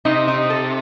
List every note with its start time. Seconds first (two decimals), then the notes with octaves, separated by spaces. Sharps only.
0.05 C3 D#4
0.28 D#4
0.50 A4